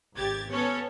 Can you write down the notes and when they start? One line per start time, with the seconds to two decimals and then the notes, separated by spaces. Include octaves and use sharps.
0.17 G#1 G4 G#6 A6
0.51 B3 C#4 A4 C#5